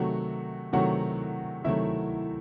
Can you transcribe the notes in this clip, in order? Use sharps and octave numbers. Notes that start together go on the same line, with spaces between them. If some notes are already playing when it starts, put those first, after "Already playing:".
Already playing: C3 D#3 F#3 A3 F#4 F#5
C3 D#3 F#3 A3 F#4 F#5
C3 D#3 F#3 A3 E4 E5